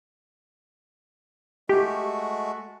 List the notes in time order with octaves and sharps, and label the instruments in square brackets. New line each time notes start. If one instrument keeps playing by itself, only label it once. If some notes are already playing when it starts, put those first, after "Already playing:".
[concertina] G#3 A3 F#4 [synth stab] G4